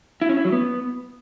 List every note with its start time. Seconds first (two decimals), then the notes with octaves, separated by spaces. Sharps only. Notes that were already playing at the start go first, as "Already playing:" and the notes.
0.22 E4
0.29 C#4
0.37 E4
0.45 F#3
0.52 B3